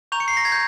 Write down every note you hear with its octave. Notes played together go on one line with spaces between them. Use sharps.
A#5 C#6 G6 F7
C#7
C7
A#6
G#6
G6